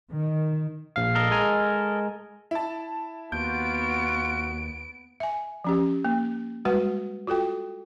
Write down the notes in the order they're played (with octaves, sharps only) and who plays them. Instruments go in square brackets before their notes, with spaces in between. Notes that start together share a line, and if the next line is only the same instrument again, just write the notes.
[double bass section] D#3
[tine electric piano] A#1 F5
[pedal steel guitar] A4 A#4 D#5
[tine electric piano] G#3 G#5 A#5
[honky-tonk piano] E4 A5
[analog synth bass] D#2 [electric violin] B3 D7 [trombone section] F4 F#4 [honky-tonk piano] G6
[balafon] E5 G#5
F3 C#4 G4
A#3
G3 G#3 F#4 B4 F#5
F4 F#4 A4 G5